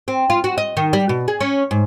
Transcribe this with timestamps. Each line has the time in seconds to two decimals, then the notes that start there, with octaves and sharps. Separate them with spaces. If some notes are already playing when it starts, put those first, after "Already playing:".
0.08 C4
0.30 F4
0.44 F#4
0.58 D#5
0.77 D#3
0.93 G3
1.09 B2
1.28 G#4
1.41 C#4
1.71 G#2